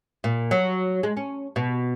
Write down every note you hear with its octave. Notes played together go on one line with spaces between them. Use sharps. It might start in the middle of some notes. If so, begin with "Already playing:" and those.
A#2
F#3
G#3
C#4
B2